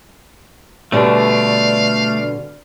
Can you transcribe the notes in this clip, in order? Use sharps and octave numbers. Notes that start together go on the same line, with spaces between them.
B2 D3 G3 A3 D4 D5 F5